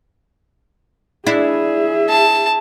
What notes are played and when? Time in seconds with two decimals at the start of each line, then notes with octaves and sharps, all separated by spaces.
1.26 D4 E4 G#4 E5
2.09 A5